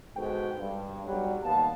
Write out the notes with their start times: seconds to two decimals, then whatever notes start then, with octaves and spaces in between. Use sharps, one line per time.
0.16 G#2 B2 F#4 A4 G5
0.58 G2
1.05 B1 F#3 G3
1.44 D#2 B3 F5 A5